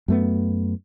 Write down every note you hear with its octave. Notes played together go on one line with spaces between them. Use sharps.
F#2 A3 B3